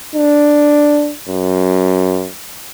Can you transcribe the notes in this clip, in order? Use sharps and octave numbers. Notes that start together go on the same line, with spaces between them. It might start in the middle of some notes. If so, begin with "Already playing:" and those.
D4
F#2